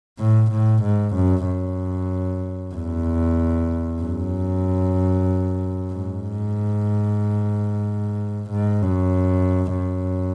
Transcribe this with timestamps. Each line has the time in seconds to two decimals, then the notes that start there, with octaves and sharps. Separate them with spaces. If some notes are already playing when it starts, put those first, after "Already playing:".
0.19 A2
0.51 A2
0.83 G#2
1.15 F#2
1.46 F#2
2.74 E2
4.02 F#2
5.94 G#2
8.50 G#2
8.82 F#2
9.78 F#2